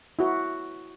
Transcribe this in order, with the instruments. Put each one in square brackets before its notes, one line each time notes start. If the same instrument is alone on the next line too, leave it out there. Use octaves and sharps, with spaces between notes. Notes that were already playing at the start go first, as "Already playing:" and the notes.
[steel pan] E4 F#4